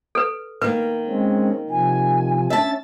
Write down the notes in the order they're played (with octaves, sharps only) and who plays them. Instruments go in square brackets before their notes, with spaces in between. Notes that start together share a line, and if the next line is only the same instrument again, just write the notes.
[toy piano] A4 B4
[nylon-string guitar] D#3 A#3 [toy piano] B4
[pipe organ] G#3 C4 C#4
[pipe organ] C3 F3 [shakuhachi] G#5
[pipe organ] C#4 A6 [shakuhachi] D4 [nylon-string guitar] E5 A5